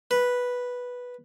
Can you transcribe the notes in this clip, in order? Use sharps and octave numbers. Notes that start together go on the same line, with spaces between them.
B4